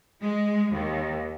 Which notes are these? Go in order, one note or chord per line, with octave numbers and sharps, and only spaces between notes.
G#3
D#2